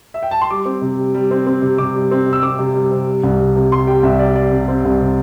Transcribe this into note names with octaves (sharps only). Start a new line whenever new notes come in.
E5
G5
A5
C6
G3 D6
C4
C3
G3
G3
C4
C4
C3
C3 D6
G3
C4
C3
E6
C4 D6
C3
G3
C3
G3
C2
C3
C3
G3 C6
G3 G5
C2 E5
G3 D5
G3 D5
C3
C4
C2
C3